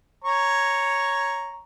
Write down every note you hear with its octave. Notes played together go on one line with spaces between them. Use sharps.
C#5 A#5 C#6